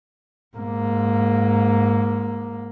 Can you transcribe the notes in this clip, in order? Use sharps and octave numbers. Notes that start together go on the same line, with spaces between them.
G#2 A#3